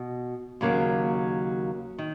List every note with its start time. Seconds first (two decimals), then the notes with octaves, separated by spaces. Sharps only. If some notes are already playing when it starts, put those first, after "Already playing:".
Already playing: B2
0.61 D#2 C#3 F#3 A#3
1.98 D#3